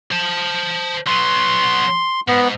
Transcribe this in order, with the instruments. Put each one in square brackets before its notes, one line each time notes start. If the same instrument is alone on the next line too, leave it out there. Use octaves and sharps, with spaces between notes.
[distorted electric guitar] C5 A5
[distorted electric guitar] F#3 B3 [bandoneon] C6
[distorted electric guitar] G#2 [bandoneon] B3